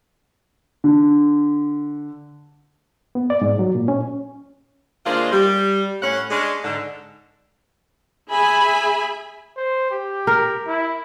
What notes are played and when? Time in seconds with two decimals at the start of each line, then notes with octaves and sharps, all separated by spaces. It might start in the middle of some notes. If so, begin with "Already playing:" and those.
0.84 D3
3.15 B3
3.30 D5
3.42 G#2
3.59 F#3
3.75 A#2
3.88 C#4
5.05 D#3 G#3 A#3 D4 F4 C5
5.32 G3
6.02 A2 C#4 F#5
6.30 G#3 C#4 D4
6.63 G#2 D3
8.31 G#4 E5 G#5 B5
9.57 C5
9.91 G4
10.27 A#4
10.67 E4